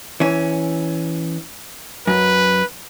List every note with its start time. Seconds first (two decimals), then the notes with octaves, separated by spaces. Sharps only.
0.20 E3 C#4
2.07 F#2 B4